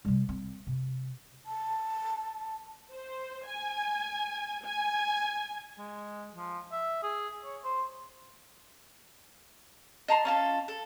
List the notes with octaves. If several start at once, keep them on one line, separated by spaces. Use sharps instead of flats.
C3 G3
C4
C3
A5
C5
G#5
G#5
G#3
F3
E5
G#4
C#5
C5
D#5 A5 A#5 C6
C#4 F4 A4
A4